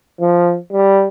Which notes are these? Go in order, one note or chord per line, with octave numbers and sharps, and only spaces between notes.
F3
G3